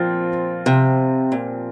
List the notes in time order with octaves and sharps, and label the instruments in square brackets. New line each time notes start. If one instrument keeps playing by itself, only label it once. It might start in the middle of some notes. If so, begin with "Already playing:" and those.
Already playing: [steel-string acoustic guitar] A#2 [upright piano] F3 C4 F4
[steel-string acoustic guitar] C3
A#2